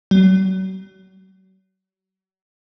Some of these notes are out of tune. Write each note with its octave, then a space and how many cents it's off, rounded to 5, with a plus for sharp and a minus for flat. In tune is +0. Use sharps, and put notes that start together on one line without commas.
F#3 +40